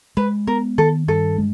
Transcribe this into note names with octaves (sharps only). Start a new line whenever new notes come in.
G#3 B4
B3 A#4
D#3 A4
G2 A4
G#3